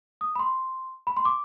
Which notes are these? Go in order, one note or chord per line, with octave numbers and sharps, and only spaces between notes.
D#6
B5
C6
B5
C6
D6